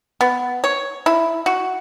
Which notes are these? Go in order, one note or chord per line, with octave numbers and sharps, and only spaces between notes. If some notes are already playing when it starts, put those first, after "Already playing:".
B3
C#5
E4
F#4